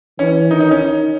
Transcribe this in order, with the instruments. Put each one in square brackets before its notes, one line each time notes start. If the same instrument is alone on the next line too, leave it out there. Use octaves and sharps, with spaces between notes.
[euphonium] E3 [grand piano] C#4
[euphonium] D#3 [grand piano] D#4
[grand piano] D#4
C#4